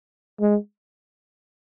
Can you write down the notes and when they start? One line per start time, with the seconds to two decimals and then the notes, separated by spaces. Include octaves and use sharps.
0.41 G#3